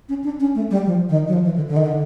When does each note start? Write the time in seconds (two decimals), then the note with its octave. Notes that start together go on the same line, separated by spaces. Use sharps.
0.09 C#4
0.24 D4
0.40 C#4
0.55 A3
0.71 G3
0.86 F3
1.09 D#3
1.28 F#3
1.33 F3
1.45 E3
1.56 D3
1.68 D3
1.77 D#3
1.86 D3